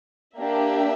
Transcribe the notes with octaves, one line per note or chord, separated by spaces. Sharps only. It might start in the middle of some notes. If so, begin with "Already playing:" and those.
A#3 D4 G4 E5